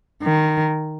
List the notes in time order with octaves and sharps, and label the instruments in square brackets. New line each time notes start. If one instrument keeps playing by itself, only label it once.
[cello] D#3